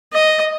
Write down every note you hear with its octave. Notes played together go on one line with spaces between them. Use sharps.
D#5